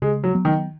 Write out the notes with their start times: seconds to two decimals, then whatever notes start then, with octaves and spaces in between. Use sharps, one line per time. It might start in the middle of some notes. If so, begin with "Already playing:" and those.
0.02 C#3 G#3
0.24 F#3
0.34 F#3 B3
0.45 D#3